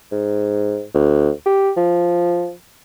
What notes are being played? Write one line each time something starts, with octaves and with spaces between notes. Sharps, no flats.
G#2
D2
G4
F3